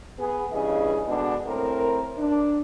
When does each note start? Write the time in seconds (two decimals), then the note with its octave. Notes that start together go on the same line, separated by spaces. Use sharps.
0.19 B3 G#4
0.53 G2 C#3 E3 G#4 D#5
1.07 B2 D3 G#3 D4
1.46 A2 C4 A#4
2.18 D4